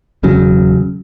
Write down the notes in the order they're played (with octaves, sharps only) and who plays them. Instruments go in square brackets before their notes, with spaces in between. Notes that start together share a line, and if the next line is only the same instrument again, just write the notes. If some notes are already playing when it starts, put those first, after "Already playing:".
[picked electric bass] E1 C#3 F#3